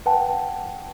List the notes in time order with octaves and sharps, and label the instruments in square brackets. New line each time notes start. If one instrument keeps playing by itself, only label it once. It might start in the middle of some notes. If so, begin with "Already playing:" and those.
[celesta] B4 F#5 G5 A5